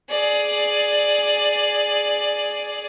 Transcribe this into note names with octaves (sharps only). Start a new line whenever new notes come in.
G#4 D5